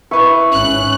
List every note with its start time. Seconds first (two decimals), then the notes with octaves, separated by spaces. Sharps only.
0.11 E4 B4 C#6
0.52 G#1 C#4 F#6